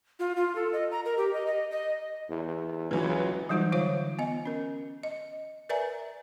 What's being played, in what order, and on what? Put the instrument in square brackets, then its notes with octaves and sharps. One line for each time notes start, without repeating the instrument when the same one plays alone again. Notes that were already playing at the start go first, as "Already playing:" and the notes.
[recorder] F4
F4
A4
D#5
A#5
A#4
G4
D#5
D#5
D#5
[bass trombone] E2
[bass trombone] C#2 [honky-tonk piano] E3 F#3
[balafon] E3 F#3 G3 D#4 F4 C5
D3 F4 C5 C#5 F5
B3 D#5
C#4 A#4
D#5
A#4 B4 D5 E5 G#5 A#5